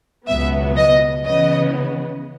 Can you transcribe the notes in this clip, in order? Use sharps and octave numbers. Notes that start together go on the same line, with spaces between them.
C#2 B2 F#3 B3 E5
D#5
C#3 E3 B3 D#5